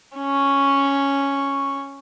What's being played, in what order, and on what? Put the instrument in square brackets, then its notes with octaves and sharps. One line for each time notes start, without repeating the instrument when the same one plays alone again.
[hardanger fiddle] C#4 C#6